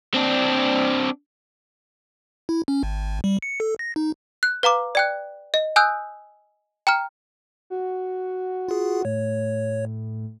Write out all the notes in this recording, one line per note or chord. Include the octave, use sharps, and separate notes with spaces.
C4 D4
E4
C#4
G#1
G3
C#7
A4
A#6
D#4
F#6
B4 F5 A#5 D6
D5 G5 F#6
D#5
G#5 D#6 E6 F#6 G6
G5 A#5 F6
F#4
F4 G#4
A2 C#5